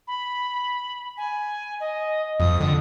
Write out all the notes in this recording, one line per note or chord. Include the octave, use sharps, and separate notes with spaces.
B5
G#5
D#5
F2 D#6
D3